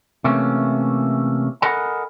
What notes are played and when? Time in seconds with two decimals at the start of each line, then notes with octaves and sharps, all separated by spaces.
0.24 C3 E3 A3 A#3 C#4
1.62 A4 A#4 D#5 F#5 G#5 B5